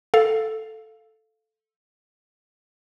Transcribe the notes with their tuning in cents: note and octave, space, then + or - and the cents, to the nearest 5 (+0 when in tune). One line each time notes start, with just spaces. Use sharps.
A4 +0 F5 +0